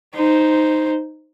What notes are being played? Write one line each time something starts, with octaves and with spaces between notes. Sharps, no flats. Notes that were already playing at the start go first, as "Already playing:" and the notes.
D#4 C5